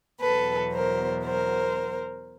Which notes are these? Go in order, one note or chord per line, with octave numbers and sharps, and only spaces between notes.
E2 B2 F#3 A4 B4
A#4 C5
A#4 C5